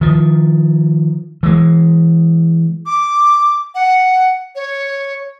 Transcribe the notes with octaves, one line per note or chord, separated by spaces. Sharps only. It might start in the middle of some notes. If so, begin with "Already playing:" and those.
D#3 F3
E3 G#3
D6
F#5
C#5